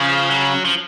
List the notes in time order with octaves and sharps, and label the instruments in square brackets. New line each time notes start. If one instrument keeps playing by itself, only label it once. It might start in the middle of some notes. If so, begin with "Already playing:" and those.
Already playing: [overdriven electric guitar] C#3 [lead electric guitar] F3
[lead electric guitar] F#3
F3